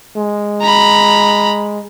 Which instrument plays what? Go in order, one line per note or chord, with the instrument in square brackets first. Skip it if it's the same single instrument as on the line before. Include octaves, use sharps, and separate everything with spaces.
[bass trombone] G#3
[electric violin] A#5 B5